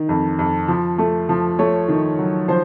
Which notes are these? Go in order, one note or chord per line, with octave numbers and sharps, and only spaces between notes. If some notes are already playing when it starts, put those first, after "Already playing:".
Already playing: D#3
F2
F2
F3
A3
F3
A3 C#5
D#3
F#3
F3 C5